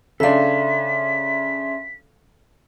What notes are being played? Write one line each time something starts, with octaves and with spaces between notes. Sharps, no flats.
C#3 D4 A4 E5 F5 C6 B6